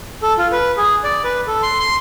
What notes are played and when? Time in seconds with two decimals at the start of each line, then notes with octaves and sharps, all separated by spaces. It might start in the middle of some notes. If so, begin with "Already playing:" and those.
0.23 A4
0.38 F4
0.52 B4
0.77 G#4
1.04 D5
1.24 B4
1.47 A4
1.63 C6
1.80 C6